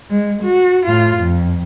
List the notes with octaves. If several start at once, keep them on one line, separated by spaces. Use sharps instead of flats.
G#3
F#4
A2 F4
F2